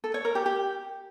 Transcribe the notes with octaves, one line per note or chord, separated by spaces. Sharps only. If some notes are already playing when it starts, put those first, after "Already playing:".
A4
C#5
A#4
G4
G4